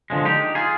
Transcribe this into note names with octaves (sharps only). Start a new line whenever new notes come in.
D3 F3 G#3
D#4 G4
F4 G#4